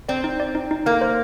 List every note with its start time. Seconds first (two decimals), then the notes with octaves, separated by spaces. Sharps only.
0.09 C4 D5
0.24 D#4
0.40 D5
0.55 D#4
0.71 D#4
0.86 A#3 A#4
1.01 C5